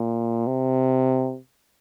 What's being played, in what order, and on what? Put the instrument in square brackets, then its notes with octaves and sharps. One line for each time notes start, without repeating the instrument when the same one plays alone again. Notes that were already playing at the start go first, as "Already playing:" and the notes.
Already playing: [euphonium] A#2
C3